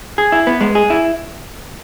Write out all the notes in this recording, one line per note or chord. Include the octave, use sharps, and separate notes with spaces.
G#4
E4
B3
G#3
G#4
E4